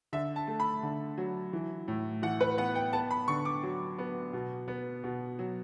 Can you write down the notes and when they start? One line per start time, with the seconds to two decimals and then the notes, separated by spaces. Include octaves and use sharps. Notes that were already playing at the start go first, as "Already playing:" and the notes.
0.13 D3 E5
0.36 A5
0.47 A3
0.60 B5
0.83 D3
1.18 F#3
1.53 E3
1.88 A2
2.22 E3 F#5
2.41 B4
2.58 B3 F#5
2.75 G5
2.93 B3 A5
3.11 B5
3.28 D3 C#6
3.45 D6
3.63 F#3
3.98 B3
4.33 B2
4.68 B3
5.04 B2
5.39 F#3